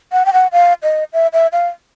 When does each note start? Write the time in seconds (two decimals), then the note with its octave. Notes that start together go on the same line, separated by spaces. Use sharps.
0.12 F#5
0.26 G5
0.33 F#5
0.52 F5
0.83 D#5
1.13 E5
1.33 E5
1.53 F5